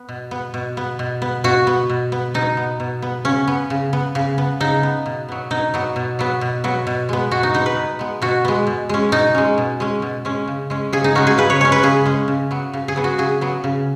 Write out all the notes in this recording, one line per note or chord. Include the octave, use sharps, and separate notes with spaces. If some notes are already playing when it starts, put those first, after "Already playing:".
Already playing: B3
B2
B3
B2
B3
B2
B3
B2 F#4
B3
B2
B3
B2 D#4
B3
B2
B3
C#3 C#4
B3
C#3
B3
C#3
B3
C#3 D#4
B3
B2
F#3 B3
B2 D#4
F#3 B3
B2
F#3 B3
B2
F#3 B3
B2
G#3 B3
B2 F#4
D#4
G#3 B3 D#4
B4
B2
G#3 B3
B2 F#4
G#3 B3
B2
G#3 C#4
B2 D#4
G#3 C#4
B2
G#3 C#4
B2
G#3 C#4
C#3
G#3 C#4
C#3 G#4
D#4
G#3 C#4 F#4
G#4
C#3 B4
C#5
G#3 C#4 C#5
B4
C#3 G#4
G#3 C#4
C#3
F#3 B3
C#3
G#4
F#3 B3
F#4
C#3 G#4
F#3 B3
C#3